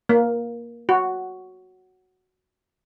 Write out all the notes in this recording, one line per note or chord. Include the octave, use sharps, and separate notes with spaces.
A#3
F#4